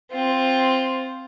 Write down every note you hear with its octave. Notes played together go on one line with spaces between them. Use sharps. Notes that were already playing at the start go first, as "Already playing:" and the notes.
C4 F4